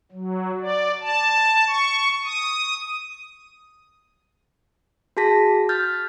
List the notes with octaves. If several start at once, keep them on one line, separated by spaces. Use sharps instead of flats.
F#3
D5
A5
C#6
D#6
F#4 G#4 A5 A#6 B6
F6 G6 A6